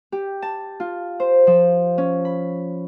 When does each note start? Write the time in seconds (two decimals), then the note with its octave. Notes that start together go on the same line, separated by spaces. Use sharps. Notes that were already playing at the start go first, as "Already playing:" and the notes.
0.12 G4
0.42 A5
0.80 F4
1.20 C5
1.47 F3
1.98 C#4
2.25 B5